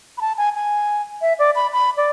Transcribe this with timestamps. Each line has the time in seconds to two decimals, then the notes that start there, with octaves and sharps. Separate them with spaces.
0.18 B5
0.21 A5
0.38 G#5
0.55 G#5
1.22 E5
1.39 D5
1.55 B5
1.73 B5
1.97 D5